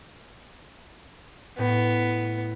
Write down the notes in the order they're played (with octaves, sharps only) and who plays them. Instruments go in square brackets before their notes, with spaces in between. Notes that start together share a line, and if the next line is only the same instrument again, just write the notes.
[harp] A2 [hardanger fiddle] B3